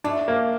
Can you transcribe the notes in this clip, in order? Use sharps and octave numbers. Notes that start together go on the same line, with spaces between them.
A3 D4
A#3